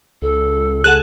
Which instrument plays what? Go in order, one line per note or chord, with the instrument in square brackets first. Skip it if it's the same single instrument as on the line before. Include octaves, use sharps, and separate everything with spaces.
[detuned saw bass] C#2 [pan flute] A4
[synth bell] G#4 A4 F#5 [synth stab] F#6